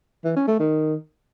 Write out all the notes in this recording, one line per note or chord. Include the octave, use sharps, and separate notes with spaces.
E3
C#4
A3
D#3